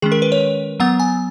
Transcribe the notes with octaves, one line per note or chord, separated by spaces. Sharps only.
D#3 G#3 C#4 G#4
A#4
B4
C#5
F#3 B3 F#5
G#5